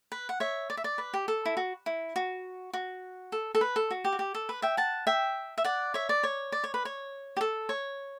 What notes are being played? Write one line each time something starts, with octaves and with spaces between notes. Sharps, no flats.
B4
F#5
C#5 E5
D5
E5
D5
B4
G4
A4
E4
F#4
E4
F#4
F#4
A4
A4
B4
A4
F#4
G4
F#4
G4
A4
B4
E5 G5
F#5 A5
E5 G5
E5
D5 F#5
C#5 E5
D5
C#5
D5
C#5
B4
C#5
G4
A4
C#5